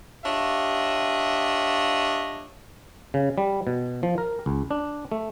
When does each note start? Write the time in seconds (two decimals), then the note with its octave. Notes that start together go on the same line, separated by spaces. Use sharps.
0.25 D4 F4 G4 C#5 D#5 E5
3.14 C#3
3.38 G3
3.67 B2
4.03 F3
4.18 A#4
4.46 C#2
4.71 D4
5.12 A3